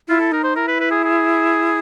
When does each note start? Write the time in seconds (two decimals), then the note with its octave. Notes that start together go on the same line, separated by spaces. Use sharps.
0.08 E4 F4
0.20 A4
0.32 D#4 A#4
0.44 C5
0.56 E4 A#4
0.68 B4
0.80 B4
0.91 G#4
1.04 G#4